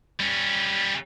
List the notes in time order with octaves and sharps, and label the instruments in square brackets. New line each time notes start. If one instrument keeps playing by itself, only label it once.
[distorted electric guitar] G3 C#4